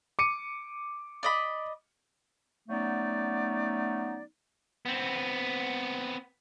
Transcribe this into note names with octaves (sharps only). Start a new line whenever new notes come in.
D6 C#7 D#7
D5 D#5 B5
F#3 A3 B3 C#4 D#4 D5
B3 C4